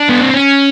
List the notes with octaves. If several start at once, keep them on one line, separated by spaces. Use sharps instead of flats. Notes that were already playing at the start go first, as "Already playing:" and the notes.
Already playing: D4
B3
C4
C#4